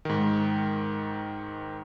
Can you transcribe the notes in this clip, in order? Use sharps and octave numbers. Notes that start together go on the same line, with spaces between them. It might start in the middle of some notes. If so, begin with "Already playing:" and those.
G#2 D#3